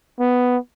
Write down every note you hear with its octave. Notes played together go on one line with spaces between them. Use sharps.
B3